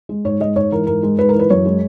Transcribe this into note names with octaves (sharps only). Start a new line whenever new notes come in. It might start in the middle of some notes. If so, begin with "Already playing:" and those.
G#3
G#2 C#5
G#3 D#5
G#2 C#5
E3 A#4
G#2 A#4
G#3
G#2 B4
E3 A#4
B4
F#2 C#5
G#3